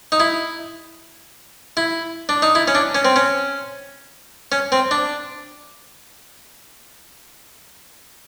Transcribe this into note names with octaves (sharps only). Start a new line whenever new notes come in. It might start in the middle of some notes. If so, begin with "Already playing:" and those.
D#4
E4
E4
D4
D#4
E4
C#4
D4
C#4
C4
C#4
C#4
C4
D4